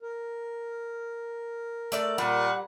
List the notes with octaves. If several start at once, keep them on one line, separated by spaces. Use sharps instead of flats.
A#4
A3 D5 A5
A#2 G3 F#5